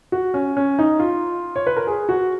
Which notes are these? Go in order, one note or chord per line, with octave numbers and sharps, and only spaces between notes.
F#4
C#4
C#4
D#4
F4
C#5
B4
A#4
G#4
F#4